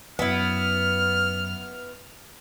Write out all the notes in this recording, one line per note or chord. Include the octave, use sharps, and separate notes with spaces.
F#2 B3 E4 F6